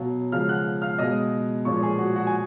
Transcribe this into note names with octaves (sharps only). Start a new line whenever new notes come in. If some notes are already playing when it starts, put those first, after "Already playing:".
Already playing: B2 F#3 F5
C#3 F3 G#3 F5 F6
F#5 F#6
F5 F6
B2 G#3 D#5 D#6
A#2 F3 G#3 C#5 C#6
G#4 G#5
F#4 F#5
F#4 F#5
G#5